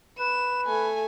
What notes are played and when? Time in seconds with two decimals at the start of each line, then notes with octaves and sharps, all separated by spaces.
0.19 B4 E7
0.66 A3 G#5